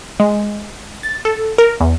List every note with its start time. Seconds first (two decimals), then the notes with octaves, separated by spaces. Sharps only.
0.20 G#3
1.03 A6
1.25 A4
1.58 A#4
1.80 E2